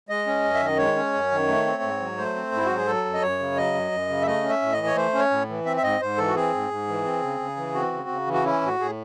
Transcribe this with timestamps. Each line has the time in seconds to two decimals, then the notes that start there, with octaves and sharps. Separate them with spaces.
0.09 G#3 D#5
0.27 C#4
0.44 F#2
0.54 E5
0.60 D#3 D#5
0.78 G#3 C#5
0.96 C#4
1.13 F#2
1.31 D#3
1.48 A3
1.65 C4
1.82 G#2
2.00 F#3
2.17 A3 C5
2.36 C4
2.52 G#2 E4
2.66 F#3 F#4
2.76 G#4
2.87 F#3 A4
3.05 F#2
3.14 D#5
3.21 F#2 C#5
3.39 C#3
3.57 F#3 D#5
3.74 F#2
3.92 F#2
4.09 C#3
4.22 E5
4.26 A3 D#5
4.43 C#4
4.49 E5
4.62 A2
4.72 D#5
4.78 E3
4.86 C#5
4.96 A3 C5
5.14 C#4
5.19 C#5
5.31 A2
5.49 E3
5.65 C4 E5
5.77 E5
5.83 G#2 D#5
6.01 G#2 C5
6.17 E3 A4
6.28 F#4
6.36 C4 G#4
6.53 G#2
6.71 G#2
6.88 E3
7.05 C4
7.22 C#3
7.40 C#3
7.57 E3
7.74 C4 F#4
7.93 C#3
8.09 C#3
8.27 E3
8.33 F#4
8.45 C#4 E4
8.61 A2
8.67 F#4
8.80 A2 G#4